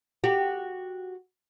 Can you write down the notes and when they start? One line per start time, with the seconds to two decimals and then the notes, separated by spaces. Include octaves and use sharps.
0.24 F#4 G4